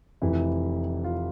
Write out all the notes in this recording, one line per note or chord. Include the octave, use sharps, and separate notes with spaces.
F1 F2 E3 E4
F4